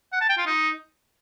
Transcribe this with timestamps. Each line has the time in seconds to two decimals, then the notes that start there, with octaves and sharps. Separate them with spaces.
0.12 F#5
0.21 A5
0.29 G5
0.38 F4
0.46 D#4